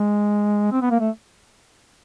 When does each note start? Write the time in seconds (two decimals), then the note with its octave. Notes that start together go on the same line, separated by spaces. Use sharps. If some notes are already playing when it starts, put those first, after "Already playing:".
Already playing: G#3
0.72 C4
0.82 B3
0.91 A#3
1.00 A3